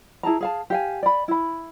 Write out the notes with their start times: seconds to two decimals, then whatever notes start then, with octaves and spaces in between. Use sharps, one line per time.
0.23 E4 G#4 A5 A#5
0.41 G#4 F5 A5
0.70 G4 F5 G#5
1.03 D5 B5
1.28 E4 B5